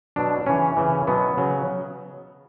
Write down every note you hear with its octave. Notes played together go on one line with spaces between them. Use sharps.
B2 F#3 D4
C#3 E3 C#4
C#3 E3
B2 F#3 B3
C#3 F#3